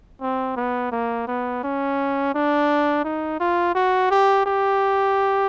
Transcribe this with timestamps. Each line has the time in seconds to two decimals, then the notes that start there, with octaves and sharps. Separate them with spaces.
0.21 C4
0.56 B3
0.92 A#3
1.27 B3
1.63 C#4
2.34 D4
3.04 D#4
3.40 F4
3.75 F#4
4.10 G4
4.46 G4